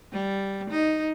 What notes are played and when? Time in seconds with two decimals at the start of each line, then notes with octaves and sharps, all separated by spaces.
0.13 G3
0.70 D#4